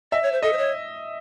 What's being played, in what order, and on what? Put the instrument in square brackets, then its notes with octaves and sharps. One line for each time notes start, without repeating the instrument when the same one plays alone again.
[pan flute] D#5 [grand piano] E5
[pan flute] C#5
C5
[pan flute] A4 [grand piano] D#5
[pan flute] C5
C#5